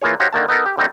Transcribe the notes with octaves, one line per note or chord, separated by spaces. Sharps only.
E3 A#3 F4 G#4 C#5
D#4 F#4 G4 C5 C#5 F5
D3 D#3 A#3 A5
B3 D#4 A4 A#4
G4
D3 G3 A3 C4 D#4